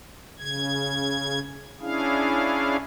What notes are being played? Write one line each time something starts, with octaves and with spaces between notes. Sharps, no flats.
C#3 G#6
C#4 D4 E4 G#4 F5